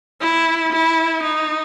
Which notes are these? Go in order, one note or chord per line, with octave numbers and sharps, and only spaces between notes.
E4
E4
D#4